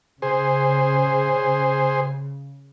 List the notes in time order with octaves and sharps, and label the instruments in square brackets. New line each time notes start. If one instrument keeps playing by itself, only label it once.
[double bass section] C#3 [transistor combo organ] G#4 C5